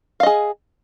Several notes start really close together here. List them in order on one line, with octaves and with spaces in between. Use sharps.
F5 D#5 G#4